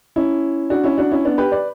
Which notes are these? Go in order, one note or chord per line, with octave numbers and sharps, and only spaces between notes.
C#4 E4
D4 F#4
C#4 E4
D4 F#4
C#4 E4
B3 D4
G4 B4
B4 D5